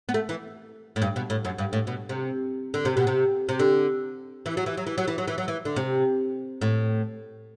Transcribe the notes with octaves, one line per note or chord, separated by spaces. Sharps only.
B3
A3
E3
A2
G2
B2
A2
F#2
G2
A2
B2
C3
D3
C3
B2
C3
C3
D3
E3
F#3
E3
F#3
E3
F#3
E3
F#3
E3
F#3
E3
D3
C3
A2